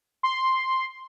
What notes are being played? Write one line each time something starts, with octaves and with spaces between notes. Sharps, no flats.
C6